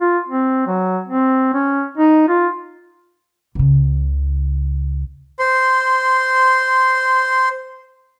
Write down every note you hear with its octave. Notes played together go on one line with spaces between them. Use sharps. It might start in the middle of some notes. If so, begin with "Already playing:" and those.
F4
C4
F#3
C4
C#4
D#4
F4
C#2 C#3
C5 C6